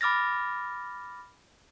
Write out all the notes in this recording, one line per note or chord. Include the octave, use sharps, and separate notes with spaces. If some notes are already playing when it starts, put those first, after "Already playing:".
B5 D6 F6 A6 A#6